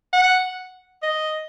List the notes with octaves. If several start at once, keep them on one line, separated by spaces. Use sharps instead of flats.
F#5
D#5